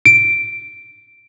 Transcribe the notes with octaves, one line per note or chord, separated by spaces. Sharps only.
D7